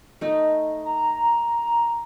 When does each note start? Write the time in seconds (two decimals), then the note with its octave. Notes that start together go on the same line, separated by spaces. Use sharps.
0.21 A3 D#4
0.85 A#5